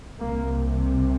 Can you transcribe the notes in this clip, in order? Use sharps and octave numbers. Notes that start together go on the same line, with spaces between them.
C2 C3 A#3